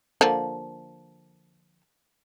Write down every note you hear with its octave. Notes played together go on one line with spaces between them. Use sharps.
D3 F3 A#3